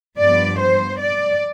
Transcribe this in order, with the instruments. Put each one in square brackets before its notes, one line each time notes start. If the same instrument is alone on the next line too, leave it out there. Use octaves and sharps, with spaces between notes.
[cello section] G2 F3 B3 D5
C5
D5